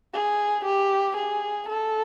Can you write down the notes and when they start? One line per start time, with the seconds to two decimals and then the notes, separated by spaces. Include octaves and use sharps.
0.14 G#4
0.65 G4
1.17 G#4
1.69 A4